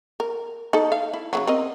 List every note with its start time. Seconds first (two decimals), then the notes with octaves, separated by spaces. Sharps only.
0.20 A#4
0.73 D#4 A4
0.92 F5
1.14 E4
1.33 C#3 E3 F#3
1.47 C4 A#4 D#5